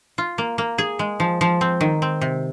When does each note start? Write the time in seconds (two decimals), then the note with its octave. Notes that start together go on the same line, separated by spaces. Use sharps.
0.18 F4
0.38 A#3
0.58 A#3
0.78 G#4
0.99 G#3
1.20 F3
1.41 F3
1.61 C4
1.81 D#3
2.02 C4
2.21 C3